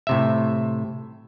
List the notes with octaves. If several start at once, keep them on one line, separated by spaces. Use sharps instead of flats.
A2 C3 E5